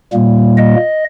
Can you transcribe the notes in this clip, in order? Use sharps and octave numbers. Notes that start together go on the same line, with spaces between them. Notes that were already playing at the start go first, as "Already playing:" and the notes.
A#2 G3 A#3
D#5